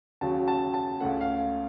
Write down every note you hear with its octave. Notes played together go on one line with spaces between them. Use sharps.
D#2 C#3 F#3 A5
A5
A5
C#2 C#3 A3 F#5
F5